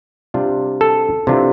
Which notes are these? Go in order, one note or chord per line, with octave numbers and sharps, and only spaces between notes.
C3 G3 D4 F4
A4
C3 E3 G3 D4 F4